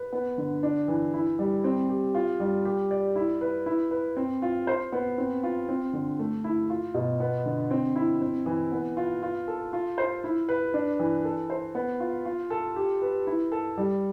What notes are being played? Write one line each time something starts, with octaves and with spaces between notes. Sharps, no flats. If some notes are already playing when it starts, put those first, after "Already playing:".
Already playing: B4
B3
D3
D4
E3
E4
G3
C4
G4
F4
G3
G4
D5
E4
B4
E4
B4
C4
F4
C5
B3
C4
F4
C4
D3
A3
E4
F4
B2
B3
D3
C4
E4
C4
E3
B3
F4
F4
A4
F4
C5
E4
B4
D4
E3
A4
C5
B3
F4
F4
A4
G4
B4
E4
A4
G3